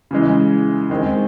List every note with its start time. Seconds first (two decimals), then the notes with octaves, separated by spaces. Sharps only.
0.11 C#3 E3 G#3
0.90 D#3 G#3 C4